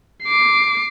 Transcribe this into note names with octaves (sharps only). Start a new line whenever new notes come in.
D6 C7